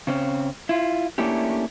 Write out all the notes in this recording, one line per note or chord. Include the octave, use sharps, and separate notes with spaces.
C#3 C4 C#4
E4 F4
A3 A#3 C#4 D4 E4 G4